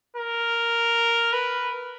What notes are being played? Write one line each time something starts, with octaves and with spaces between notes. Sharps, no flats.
A#4
B4